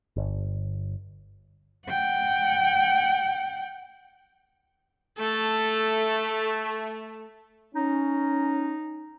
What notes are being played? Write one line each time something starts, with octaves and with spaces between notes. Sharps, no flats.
G1
F#5 G5
A3 A4
C#4 D#4